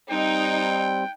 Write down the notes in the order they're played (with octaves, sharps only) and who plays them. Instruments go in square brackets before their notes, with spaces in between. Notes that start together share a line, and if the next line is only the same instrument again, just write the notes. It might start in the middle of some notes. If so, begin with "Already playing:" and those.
[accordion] G3 C4 [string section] D#4 [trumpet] G5